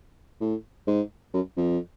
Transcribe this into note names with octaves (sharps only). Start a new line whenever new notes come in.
A2
G#2
F#2
F2